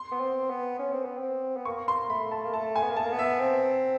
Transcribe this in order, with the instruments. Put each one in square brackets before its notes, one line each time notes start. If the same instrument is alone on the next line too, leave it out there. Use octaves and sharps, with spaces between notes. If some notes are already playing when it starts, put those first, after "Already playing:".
Already playing: [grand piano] C6
[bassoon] B3
C4
B3
C#4
C4
B3
C4
B3
[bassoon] A#3 [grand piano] C#6
[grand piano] C6
[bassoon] A3 [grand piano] B5
[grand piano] A5
[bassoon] A#3
[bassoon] A3 [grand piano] A5
[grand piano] G#5
[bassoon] B3
A#3
[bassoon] A3 [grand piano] A5
[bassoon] A#3
B3
[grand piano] E5
[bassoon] C4